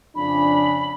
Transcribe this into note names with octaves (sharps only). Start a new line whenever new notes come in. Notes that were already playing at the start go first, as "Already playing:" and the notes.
F2 C#3 D4 B5